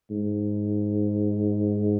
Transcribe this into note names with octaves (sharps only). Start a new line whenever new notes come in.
G#2